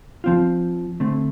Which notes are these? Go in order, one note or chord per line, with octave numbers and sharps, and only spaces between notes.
F3 C4 F4
D3 A3 C4